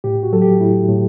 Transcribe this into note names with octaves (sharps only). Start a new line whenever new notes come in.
A2 G4
F#4
F#3 A4
G4
A2 E4
A2